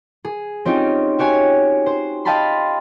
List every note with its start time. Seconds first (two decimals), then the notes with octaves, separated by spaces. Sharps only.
0.25 G#4
0.65 C4 C#4 D#4 F4 G4
1.19 F#4 G4 C#5 G#5
1.86 C5
2.25 D#5 F5 G5 A5 B5 C6